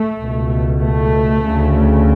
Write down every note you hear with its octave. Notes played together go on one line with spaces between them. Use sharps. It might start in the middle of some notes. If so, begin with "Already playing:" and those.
Already playing: A3
C#2 B2
A3
D2 C#3